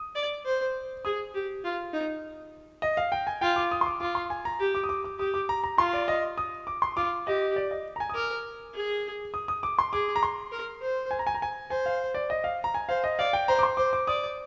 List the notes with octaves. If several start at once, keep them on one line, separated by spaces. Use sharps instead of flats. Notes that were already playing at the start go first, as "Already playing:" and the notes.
Already playing: D#6
D5
C5
G#4 D#6
G4
F4
D#4
D#5
F5
G5
G#5
F4 G5
D6
D#6
C6
D6
F4 D6
C6
G#5
A#5
G4
D6
D#6
D6
D6
G4 D#6
D6
A#5
A#5
F4 C6
D5
D#5
D#6
D6
C6
F4 D6
G4 D#5
D5
D#5
A#5
G#5
D#6
A#4 D6
G#4
D#6
D#6
D6
C6
G#4 D6
A#5
C6
A#4
C5
G#5
A#5
G#5
A#5
G#5
C5 G#5
F5
D5
D#5
F5
A#5
G#5
C5 F5
D#5
D5 F5
G5
C5 A#5
D6
C6
C5 D6
D6
D5 D#6